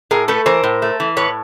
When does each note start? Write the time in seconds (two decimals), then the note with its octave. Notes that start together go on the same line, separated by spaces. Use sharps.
0.11 A2 G#4 A#4
0.28 A3 A4 B4
0.46 E3 A#4 C5
0.64 A2
0.82 A3
1.00 E3
1.17 A2 B4 C#5